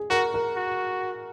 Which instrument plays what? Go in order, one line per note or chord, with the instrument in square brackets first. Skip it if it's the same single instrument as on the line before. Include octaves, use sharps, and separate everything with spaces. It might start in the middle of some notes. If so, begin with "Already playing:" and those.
Already playing: [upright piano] G#4
[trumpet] F#4 [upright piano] A#4
[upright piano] A#4
[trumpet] F#4